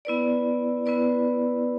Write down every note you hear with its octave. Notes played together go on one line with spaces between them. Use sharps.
B3 E4 B4 D5
B3 E4 B4 D5